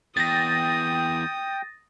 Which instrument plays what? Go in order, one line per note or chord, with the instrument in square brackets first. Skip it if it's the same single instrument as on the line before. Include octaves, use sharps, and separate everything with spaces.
[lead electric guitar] E2 [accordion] G5 [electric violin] D#6 [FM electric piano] A6 A#6